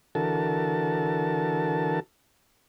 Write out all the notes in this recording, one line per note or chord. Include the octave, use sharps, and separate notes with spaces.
D3 E3 F#4 A4 A#4 A5